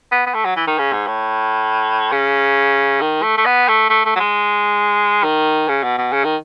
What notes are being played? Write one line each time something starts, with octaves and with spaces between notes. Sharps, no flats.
B3
B3
A3
F#3
E3
D#3
C#3
G#2
A2
C#3
D#3
A3
A3
B3
A3
A3
A3
F#3
G#3
D#3
C#3
B2
B2
C#3
D#3